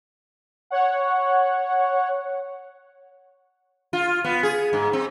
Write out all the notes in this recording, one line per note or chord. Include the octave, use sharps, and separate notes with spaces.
C#5 F#5
F4
B3
G#4
G#2
C4